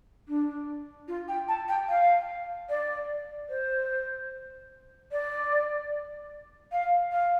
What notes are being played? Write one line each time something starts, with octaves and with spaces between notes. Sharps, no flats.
D4
F4
G5
A5
G5
F5
D5
C5
D5
F5
F5